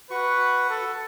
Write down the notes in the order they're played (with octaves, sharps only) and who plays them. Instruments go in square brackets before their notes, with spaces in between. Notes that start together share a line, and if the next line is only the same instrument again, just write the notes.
[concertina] F#4 C#6 [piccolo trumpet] B4
[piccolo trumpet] A4